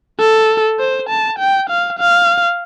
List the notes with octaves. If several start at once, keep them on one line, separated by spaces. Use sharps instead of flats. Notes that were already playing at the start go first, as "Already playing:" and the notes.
A4
C5
A5
G5
F5
F5